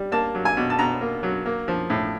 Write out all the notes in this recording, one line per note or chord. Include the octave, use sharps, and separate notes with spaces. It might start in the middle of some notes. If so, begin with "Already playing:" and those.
Already playing: G3
A#3 A5
F#3
G#5
B2
A5
B2 A#5
A#3
F#3
A#3
F3
A2